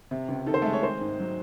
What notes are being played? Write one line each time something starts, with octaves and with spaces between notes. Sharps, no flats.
C3
C#2
D#3 A4
C5
A3 A4
G#3
C#5
D#3 C4 C5
G#2
F#3